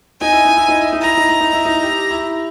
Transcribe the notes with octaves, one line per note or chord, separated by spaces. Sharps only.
D#4 G#5
E4
D#4
E4
D#4
E4
D#4
E4 A#5
D#4
E4
D#4
E4
D#4
G4
E4